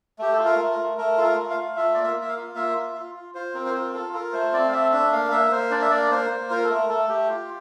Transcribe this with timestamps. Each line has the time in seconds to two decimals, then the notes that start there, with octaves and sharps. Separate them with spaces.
0.19 A3 G4
0.33 A4
0.39 F4
0.46 A#4
0.58 A3
0.72 A#4
0.79 A3
0.98 A3 A#4
1.18 F4 A4
1.24 A#4
1.37 A3
1.50 F5
1.57 A3
1.77 F4 E5
1.95 A#3 D5
2.04 E5
2.16 A#3
2.22 E5
2.29 F5
2.37 F4
2.55 A#3 E5
2.75 F4
2.95 F4
3.15 F4
3.35 F4 C5
3.54 C4 A#4
3.66 C5
3.74 F4 A#4
3.93 F4 A4
4.14 F4 A#4
4.33 A3 C5
4.53 C4 D5
4.69 F5
4.72 A3 E5
4.92 D4 E5
5.12 A#3 F5
5.31 A#3 E5
5.52 A#3 C5
5.71 D4 D5
5.82 E5
5.91 A#3 D5
6.11 A#3 C5
6.30 A#3
6.50 F4 A#4
6.63 A4
6.70 A3 A#4
6.89 A3 A4
7.09 A3 G4
7.30 F4